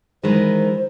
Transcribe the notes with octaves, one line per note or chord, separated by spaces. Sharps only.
D#3 E3 G#3 C5